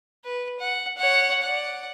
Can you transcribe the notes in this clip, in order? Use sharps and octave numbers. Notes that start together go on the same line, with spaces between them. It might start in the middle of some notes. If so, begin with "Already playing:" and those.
B4
F#5
C#5 F#5
D5 F#5